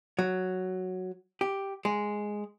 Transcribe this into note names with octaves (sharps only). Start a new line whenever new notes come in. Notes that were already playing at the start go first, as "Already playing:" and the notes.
F#3
G4
G#3